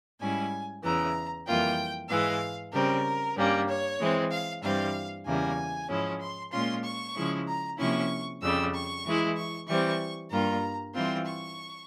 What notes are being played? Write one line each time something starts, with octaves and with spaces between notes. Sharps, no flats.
G#2 G3 C#4 E4 G#5
E2 C#3 E3 A#5
F2 E3 G3 A#3 F4 G5
G#2 E3 G#3 F5
C#3 G3 C4 A#4
G2 G3 A#3 C#4
C#5
E3 G#3 C4
F5
G2 E3 G3 C4 F5
E2 C#3 E3 G3 A#3 G#5
G#2 F3 G#3 C#4 E4
C6
A#2 G#3 C#4 F4 C6
C#6
C#3 F3 G#3 E4
A#5
C3 F3 A#3 C#4 E4 C#6
F2 C#3 G3 E6
C#6
E3 G#3 E4
C#6
E3 G3 C4 C#6
G2 G3 A#3 F4 A#5
E3 G3 C4 F4 C6
C#6